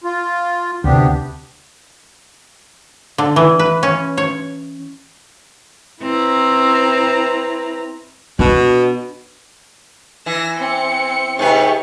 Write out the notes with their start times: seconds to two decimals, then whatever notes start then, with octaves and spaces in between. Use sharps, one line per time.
0.04 F4
0.84 D2 C3 B3 D4 G4
3.18 D3
3.36 E3
3.59 B4
3.83 C#4
4.17 C#5
6.02 C4 E4 B4 A#5
8.39 B2 D4
10.26 E3 A#6 E7
10.58 C4 C#7
11.39 G#2 C3 G4 B4 C#6